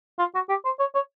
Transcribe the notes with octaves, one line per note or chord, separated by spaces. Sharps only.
F4
F#4
G4
C5
C#5
C#5